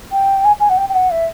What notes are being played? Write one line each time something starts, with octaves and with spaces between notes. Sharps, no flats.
G5
G#5
G#5
F#5
G5
G5
F#5
E5